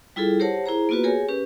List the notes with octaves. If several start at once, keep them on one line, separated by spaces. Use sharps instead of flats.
G3 E4 F4 G#4 A4
G4 A#4 C5 C#5 F#5 A5
E4 G#4 C5 A#5
A#3 B3 F4 F#4 B4
G4 G#4 A#4 C#5 G#5
C#4 G4 B4